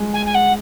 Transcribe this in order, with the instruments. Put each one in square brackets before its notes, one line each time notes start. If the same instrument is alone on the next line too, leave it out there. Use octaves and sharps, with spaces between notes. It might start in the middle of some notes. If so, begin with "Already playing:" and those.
Already playing: [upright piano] G#3
[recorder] G#5
G#5
F#5